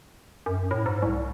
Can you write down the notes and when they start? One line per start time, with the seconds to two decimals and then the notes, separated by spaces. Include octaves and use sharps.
0.46 F#2
0.71 A2
0.86 G#2
1.02 C2